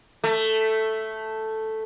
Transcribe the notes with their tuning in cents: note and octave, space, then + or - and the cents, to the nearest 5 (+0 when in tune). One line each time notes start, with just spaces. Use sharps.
A3 +0